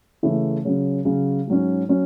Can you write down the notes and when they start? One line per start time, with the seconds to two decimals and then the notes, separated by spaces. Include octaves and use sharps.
0.23 C#3 E3 A3 C#4 E4
0.65 C#3 F#3 C#4
1.05 C#3 F#3 C#4
1.47 G#2 F#3 C#4
1.89 F#3 C#4